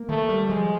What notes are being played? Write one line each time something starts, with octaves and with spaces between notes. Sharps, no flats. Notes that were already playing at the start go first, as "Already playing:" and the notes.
Already playing: A#3
D#3 A3
G3
F3 G#3